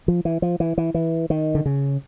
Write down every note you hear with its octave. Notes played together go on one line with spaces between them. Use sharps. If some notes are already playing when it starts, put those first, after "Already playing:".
F3
E3
F3
E3
E3
E3
D#3
D3
C#3